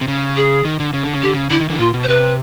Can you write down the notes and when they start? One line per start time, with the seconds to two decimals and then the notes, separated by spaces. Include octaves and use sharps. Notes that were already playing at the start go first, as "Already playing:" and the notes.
0.01 C3
0.08 C#3
0.36 G#4
0.65 D#3
0.80 D3
0.94 C#3
1.03 D3
1.14 C#3
1.22 D3 G4
1.33 C#3
1.50 D3 E4
1.60 D#3
1.70 D3 E3
1.79 A#2 F4
1.94 B2
2.03 C5
2.08 C3 B4